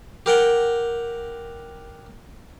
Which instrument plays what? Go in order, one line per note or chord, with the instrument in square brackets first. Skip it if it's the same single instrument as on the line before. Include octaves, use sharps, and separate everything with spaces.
[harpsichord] G4 A#4 F#5 G5